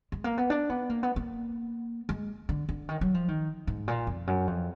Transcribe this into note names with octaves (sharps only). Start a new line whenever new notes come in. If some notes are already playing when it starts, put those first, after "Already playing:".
G#3
A#3
B3
D4
B3
A#3
B3
A#3
G#3
D3
D3
D#3
F#3
F3
D#3
G#2
A#2
F2
F#2
F2